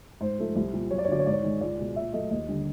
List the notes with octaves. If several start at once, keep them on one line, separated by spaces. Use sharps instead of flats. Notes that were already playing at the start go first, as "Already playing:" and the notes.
G#2 C5
F3 A3
C2
A#2 G3
F#2 C#5
D5
C#5
D3 F#3 D5
C#5
G#2 D5
C#5
D#3 G#3
C#2 D5
B2 G#3
A#2 E5
F#3 A3 D#5
D#2 D#5
D3 G3